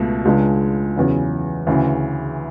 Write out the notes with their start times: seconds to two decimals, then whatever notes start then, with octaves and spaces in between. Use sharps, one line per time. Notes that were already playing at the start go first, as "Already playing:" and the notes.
Already playing: C#2 B2 A3
0.25 C#2 C#3 G#3 D4
0.96 E2 C#3 F#3
1.67 D2 C#3 E3